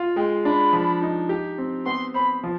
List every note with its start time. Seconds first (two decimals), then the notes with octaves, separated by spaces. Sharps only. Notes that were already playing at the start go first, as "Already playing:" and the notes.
Already playing: F4
0.16 G#3 G5
0.45 D4 B5
0.73 F3
1.02 D#4
1.29 G4
1.58 C4
1.86 B3 C6
2.14 C5 B5
2.43 F3